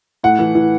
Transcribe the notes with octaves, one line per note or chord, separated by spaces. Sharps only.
A2 F#5
E3
E3